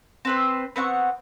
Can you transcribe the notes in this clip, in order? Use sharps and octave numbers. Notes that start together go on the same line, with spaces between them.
C4 B4 C5
B3 C4 F#5 C#6